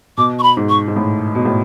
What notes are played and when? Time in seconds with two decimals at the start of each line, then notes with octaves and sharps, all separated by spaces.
0.18 B2 D6
0.39 C#6
0.43 B5
0.57 G#2
0.69 C#6
0.88 G#2
0.96 A2
1.35 B2
1.45 A2